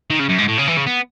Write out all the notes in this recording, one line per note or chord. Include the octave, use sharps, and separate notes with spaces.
D#3
C#3
F#2
G#2
A2
C#3
E3
C#3
B3